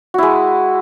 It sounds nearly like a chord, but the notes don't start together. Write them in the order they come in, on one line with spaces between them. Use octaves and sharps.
F#4 E4 G#3